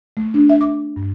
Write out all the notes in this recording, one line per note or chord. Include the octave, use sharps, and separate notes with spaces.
A3
D4
E5
D6
G2